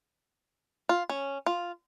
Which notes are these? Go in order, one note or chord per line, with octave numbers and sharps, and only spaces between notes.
F4
C#4
F4